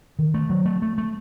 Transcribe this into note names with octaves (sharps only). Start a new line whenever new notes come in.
D#3
A3
F#3
A3
A3
A3